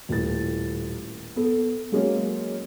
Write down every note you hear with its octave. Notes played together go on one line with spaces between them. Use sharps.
D#1 A2 A6
B3 A4
F#3 G#3 A#3 C#4